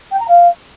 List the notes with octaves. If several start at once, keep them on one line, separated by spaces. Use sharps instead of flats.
G5
A#5
F5